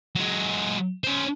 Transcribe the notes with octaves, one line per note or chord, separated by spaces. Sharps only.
F#3 G#3
C#4 C5